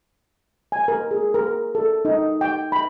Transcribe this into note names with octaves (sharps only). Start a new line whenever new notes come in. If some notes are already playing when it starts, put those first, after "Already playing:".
G#5
A#4
G#4
A#4
A4
D#4
G5
B5